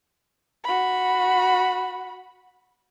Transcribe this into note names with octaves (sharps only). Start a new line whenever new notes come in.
F#4 B5